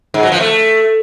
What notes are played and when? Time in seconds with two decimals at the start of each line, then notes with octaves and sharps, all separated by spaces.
0.14 G#2
0.23 F#3
0.32 F3
0.40 A3